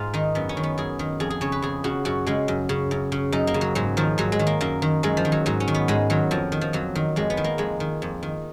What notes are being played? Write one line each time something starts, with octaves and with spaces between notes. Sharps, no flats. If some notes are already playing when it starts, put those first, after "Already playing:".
Already playing: G#2 F4
D#3 D#4
F#2 B3
C#4
D#3
B3
F#2 G#4
D#3
F2 G#4
G#4
C#3 C#5
B4
F2 G#4
C#3 F#4
F#2 F#4
C#3 G#3
F#2
C#3
F#2
C#3
F#2 D#4
A#3
C#3
F#3
G#2 F#3
D#3 F3
G#2 F#3
G#3
D#3
A#3
F#2 A#3
D#3
F#2 G#3
F3
D#3
F#3
G#2 F#3
C#4
D#3
B3
G#2 G#3
D#3 F#3
F2 F3
D#3
F3
F2 F#3
D#3
F2 G#3
B3
D#3
A#3
F2 G#3
D#3
F2
D#3